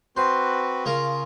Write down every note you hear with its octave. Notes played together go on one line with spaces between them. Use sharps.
C4 F#4 B4 C5
C#3 F4 A#4